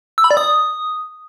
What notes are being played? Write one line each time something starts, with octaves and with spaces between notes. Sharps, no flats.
E6
B5
D5
D#6